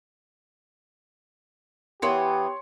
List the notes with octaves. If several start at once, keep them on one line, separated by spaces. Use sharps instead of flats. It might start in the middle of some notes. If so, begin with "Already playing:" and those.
E3 B3 G4 C#5 C6 C#7